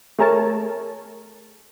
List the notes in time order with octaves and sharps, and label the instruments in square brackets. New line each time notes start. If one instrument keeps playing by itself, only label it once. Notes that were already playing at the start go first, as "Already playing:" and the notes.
[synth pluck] A3 G#4 A#4 C#5 A5